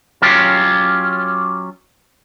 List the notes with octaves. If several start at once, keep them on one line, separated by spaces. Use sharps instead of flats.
F#3 C#4 F4 G4